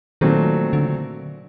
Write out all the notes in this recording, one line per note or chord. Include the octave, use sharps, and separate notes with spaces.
A#2 D#3 F#3 A3 C4
D3